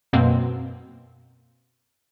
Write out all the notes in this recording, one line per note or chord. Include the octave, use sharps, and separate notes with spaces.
F#2 B2 A#3 C4